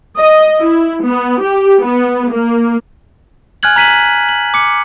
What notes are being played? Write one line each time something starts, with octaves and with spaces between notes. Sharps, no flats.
D#5
E4
B3
G4
B3
A#3
G#5 F6 F#6 G#6 F#7
A#5 B6 D#7 F#7
F#7
D6 C#7